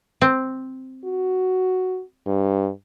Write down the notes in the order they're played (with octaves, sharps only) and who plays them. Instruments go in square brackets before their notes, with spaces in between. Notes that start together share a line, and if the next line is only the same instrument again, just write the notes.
[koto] C4
[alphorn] F#4
G2